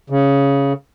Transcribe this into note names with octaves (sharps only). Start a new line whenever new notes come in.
C#3